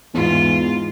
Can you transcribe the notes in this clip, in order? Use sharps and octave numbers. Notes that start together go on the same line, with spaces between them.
E2 G#2 F4